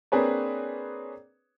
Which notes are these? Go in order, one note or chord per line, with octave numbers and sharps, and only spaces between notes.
A#3 C4 D4 G#4 B4 C#5